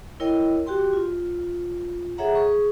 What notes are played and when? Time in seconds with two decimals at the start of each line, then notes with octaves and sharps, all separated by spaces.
0.20 E4 A#4 C#5 D#5 G5
0.66 F#4 G4 G5 C6
0.93 F4
2.18 G#4 A4 C#5 E5 F#5 A#5
2.35 G#4 C#6